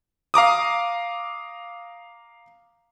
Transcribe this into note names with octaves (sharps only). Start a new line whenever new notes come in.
F5 A#5 D6 D#6